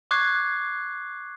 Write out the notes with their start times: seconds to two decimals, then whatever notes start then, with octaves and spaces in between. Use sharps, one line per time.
0.11 C#6 D6 F#6 G#6 C7